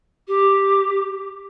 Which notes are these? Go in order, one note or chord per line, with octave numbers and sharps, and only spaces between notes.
G4